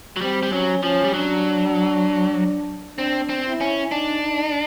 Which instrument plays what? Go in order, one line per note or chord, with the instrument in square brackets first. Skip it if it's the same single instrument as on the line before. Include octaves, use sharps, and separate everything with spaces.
[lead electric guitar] F#3
[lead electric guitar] G3 [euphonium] C4
[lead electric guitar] G3
[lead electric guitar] F#3 [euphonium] C#4
[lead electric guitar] F3 [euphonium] C#4
[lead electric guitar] G3
[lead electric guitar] F#3 [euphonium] D4
[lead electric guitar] C4 [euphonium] D4
[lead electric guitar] C4
[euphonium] E4
[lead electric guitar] C#4
[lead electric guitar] D4 [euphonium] D#4
[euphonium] D#4